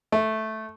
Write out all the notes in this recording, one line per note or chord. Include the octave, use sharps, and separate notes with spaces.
A3